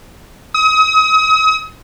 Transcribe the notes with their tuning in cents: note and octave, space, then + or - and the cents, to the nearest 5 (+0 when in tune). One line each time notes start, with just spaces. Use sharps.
D#6 +35